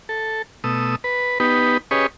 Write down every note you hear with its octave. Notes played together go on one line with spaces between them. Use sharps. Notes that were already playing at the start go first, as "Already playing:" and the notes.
A4
B2 A3 D#6 E6
B4
B3 D#4 G4 B4
C#4 G4 G#4 B4 C#5 D#5